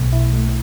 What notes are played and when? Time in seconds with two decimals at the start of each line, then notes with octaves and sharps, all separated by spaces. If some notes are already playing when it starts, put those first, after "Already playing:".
Already playing: B1 B2 A3
0.13 E4
0.33 A3